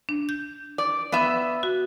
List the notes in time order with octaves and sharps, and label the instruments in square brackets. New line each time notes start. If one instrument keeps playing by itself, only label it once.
[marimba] D4
G6
[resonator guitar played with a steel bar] D5
B3 E5
[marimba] F#4